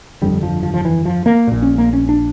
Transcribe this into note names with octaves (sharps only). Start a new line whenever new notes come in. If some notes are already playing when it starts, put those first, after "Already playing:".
G1 F2 D3 G3
F3
F3
F3
E3
F3
A#3
A#1 A#2
C#4
A#3
C#4
D4